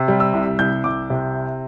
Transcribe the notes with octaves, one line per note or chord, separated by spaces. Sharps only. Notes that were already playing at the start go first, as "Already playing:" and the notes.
Already playing: C3
G3
E6
C2
C2 G6
C2 D6
C3